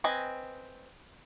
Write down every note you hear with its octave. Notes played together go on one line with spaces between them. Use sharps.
C4 B4 D#5 G#5